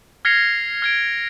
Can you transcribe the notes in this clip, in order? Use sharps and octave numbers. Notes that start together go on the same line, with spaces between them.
F6 G#6 A#6 C7 C#7 F7
F6 G#6 D7